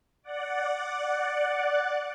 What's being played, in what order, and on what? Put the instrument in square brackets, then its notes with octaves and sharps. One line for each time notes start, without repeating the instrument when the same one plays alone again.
[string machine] D5 F#5